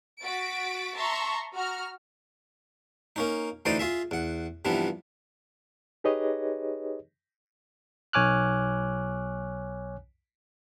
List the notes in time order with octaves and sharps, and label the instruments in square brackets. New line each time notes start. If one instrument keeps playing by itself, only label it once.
[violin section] F#4 A6 B6 D7
E5 A5 A#5 C6 C#6
F#4 A#5 F6
[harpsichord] A#3 C#4 D#4
D2 E3 D#4 C5 D5 D#5
F4 G#4 E5
E2 F#5
G2 C3 E3 F3 B3
[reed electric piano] D#4 G4 G#4 B4 C#5 D#5
[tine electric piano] B1 C#5 G#5 D6 F6 F#6